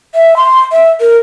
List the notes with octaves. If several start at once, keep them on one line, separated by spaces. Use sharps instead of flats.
E5
C6
E5
A#4